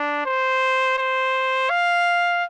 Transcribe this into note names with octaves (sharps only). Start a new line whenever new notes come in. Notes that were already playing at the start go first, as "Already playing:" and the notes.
Already playing: D4
C5
C5
F5